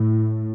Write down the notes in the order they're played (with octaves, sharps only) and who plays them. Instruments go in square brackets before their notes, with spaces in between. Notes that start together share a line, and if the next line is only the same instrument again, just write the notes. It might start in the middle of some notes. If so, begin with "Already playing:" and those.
Already playing: [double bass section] A2